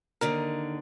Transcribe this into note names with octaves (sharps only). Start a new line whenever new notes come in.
D#2 D3 D#3 A#4